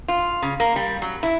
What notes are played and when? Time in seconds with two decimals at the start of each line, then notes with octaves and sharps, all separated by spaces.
0.08 F4
0.42 C#3
0.60 A#3
0.76 G3
1.02 F#3
1.23 E4